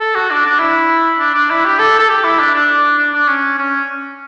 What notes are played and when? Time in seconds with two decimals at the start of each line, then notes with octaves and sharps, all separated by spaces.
0.01 A4
0.15 F#4
0.31 D4
0.46 D4
0.59 E4
1.19 D4
1.34 D4
1.50 E4
1.65 G4
1.79 A4
1.99 A4
2.09 G4
2.24 E4
2.39 D4
2.54 D4
2.98 D4
3.14 D4
3.28 C#4
3.59 C#4